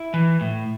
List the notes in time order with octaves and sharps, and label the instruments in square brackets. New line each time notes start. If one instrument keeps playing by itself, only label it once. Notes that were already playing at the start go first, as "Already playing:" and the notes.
Already playing: [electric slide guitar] E4
E3
A2